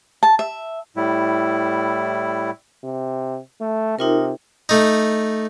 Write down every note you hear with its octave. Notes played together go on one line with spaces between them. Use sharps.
A5
E5
A2 G3 E4
C3
A3
C3 D#4 F4 A#4
A3 D#4